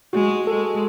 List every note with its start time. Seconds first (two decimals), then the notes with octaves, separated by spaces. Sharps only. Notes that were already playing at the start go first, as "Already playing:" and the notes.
0.13 G#3 F#4
0.47 G#3 A4